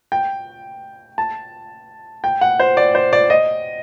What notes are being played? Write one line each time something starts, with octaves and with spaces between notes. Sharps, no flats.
G5
A5
G5
F#5
C5
D5
C5
D5
D#5